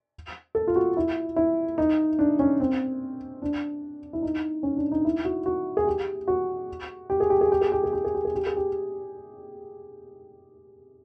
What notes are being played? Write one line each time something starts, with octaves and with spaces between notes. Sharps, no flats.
A4
F4
F#4
E4
E4
D#4
D4
C#4
C4
D4
E4
D#4
C#4
D4
D#4
E4
F#4
F#4
G#4
G4
F#4
G4
G#4
G4
G#4
G4
G#4
G4
G#4
G4
G#4
G4
G#4
G4
G#4
G4